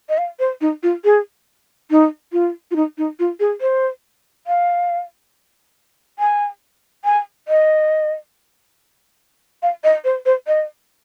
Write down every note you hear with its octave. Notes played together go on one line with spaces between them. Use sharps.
D#5
F5
C5
D#4
F4
G#4
D#4
F4
F4
D#4
D#4
F4
G#4
C5
F5
G#5
G#5
D#5
F5
D#5
C5
C5
D#5